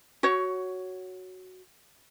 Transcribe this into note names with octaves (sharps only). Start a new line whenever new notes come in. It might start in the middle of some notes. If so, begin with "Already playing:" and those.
F#4 C#5